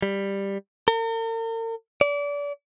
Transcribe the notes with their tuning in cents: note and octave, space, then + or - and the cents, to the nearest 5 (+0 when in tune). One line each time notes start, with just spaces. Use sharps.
G3 +10
A#4 -45
D5 -30